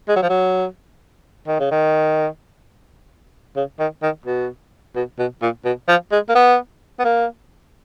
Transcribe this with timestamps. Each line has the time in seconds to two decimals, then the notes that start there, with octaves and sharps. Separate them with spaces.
0.09 G#3
0.16 F#3
0.22 F3
0.30 F#3
1.47 D#3
1.60 C#3
1.71 D#3
3.56 C#3
3.80 D#3
4.03 D#3
4.26 B2
4.95 B2
5.19 B2
5.42 A#2
5.65 B2
5.88 F3
6.12 G#3
6.29 A#3
6.35 B3
6.99 B3
7.05 A#3